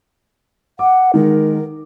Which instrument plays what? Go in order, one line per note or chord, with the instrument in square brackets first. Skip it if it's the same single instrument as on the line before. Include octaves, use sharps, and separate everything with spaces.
[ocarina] F#5 [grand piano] D6
[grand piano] D#3 G#3 [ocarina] A#4